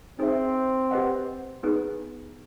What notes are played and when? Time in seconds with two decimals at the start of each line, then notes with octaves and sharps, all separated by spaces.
0.19 C4 D#4 G#4 C5 E5
0.91 G4 B4 D#5 F#5
1.63 B3 D#4 G#4 B4